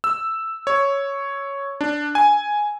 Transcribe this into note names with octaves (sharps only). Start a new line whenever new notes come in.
E6
C#5
D4
G#5